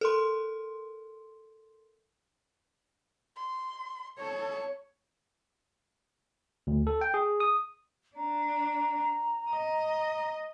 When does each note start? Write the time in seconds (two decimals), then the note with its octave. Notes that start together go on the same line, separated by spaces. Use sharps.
0.01 A4 A#4 C6
3.36 C6
4.19 A4 C#5
6.67 D2
6.87 A4
7.01 G5
7.14 G#4
7.40 D#6
8.17 D4 A#5
9.50 D#5